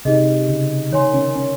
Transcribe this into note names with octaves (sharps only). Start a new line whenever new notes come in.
C3 D#4 G#4 D#5
C#3
D#3 C#5 G#5 C6
C#4
C#4